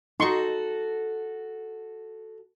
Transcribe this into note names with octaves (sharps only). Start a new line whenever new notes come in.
D#4 F#4 A4 C6 C#6